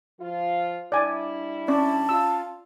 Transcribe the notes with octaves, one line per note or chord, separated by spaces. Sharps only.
F3 F4
G3 D4 E4 D5 G#5
C#4 D5 A5
F4 E6